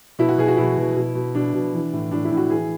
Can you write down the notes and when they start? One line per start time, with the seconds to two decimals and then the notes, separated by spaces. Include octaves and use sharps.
0.19 B2 E4
0.29 F#4
0.38 B2 G#4
0.48 F#4
0.57 B2 E4
0.78 B2
0.96 B2
1.15 B2
1.35 B2 D4
1.54 B2
1.74 E3
1.93 A2
2.11 A2 D4
2.25 E4
2.31 A2
2.37 F#4
2.50 E3 G#4